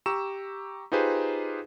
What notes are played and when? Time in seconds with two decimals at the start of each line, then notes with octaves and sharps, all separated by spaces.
0.06 G4 A#5 C#6 E6 E7
0.92 D#4 F4 G4 G#4 B4 C5